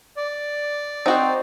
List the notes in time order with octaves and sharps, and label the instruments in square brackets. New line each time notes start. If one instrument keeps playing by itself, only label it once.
[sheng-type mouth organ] D5
[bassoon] C4 [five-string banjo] D#4 F#4 C5